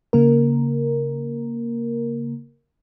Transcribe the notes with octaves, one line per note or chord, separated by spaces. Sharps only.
C#3 A#3 A#4